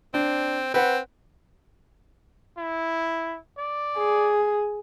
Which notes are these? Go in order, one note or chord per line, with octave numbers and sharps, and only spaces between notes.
C4 D4
C4 B4 F#5
E4
D5
G#4